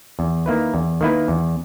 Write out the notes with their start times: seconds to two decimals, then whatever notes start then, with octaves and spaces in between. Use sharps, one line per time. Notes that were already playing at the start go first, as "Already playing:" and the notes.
0.19 E2
0.46 D#3 A#3 E4 B4
0.74 E2
1.01 D#3 A#3 E4 B4
1.28 E2